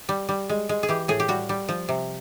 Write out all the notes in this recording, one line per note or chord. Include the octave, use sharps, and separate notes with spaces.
G3
G3
G#3
G#3
G#4
E3 G4
A2 G#4
G4
G3 F#4
G3
F3
C3